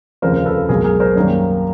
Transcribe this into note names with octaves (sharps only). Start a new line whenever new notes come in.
F1 D#2 C#3 F3 A#4 C5
A4 B4
B1 B2 G#3 G#4 A#4
G#4 A#4
A#4 C5
F#2 D#3 G3 A#3